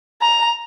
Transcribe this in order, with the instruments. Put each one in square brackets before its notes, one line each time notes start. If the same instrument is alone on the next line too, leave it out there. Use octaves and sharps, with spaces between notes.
[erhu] A#5